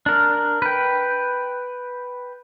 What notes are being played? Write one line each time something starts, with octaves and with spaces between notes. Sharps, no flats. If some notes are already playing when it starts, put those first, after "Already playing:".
D4 A#4
B4 G5